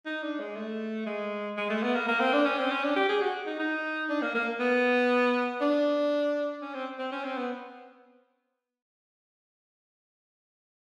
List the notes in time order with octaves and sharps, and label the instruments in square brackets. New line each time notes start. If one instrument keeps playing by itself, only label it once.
[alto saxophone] D#4
D4
G#3
A3
G#3
G#3
A3
B3
A#3
A#3
C4
D4
C#4
C4
C#4
D4
G4
G#4
F#4
D#4
D#4
D4
A#3
A#3
B3
D4
C#4
C4
C4
C#4
C4
B3